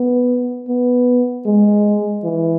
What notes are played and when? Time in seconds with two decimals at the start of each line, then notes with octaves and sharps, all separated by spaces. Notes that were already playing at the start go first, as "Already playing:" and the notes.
Already playing: B3
0.69 B3
1.46 G#3
2.24 E3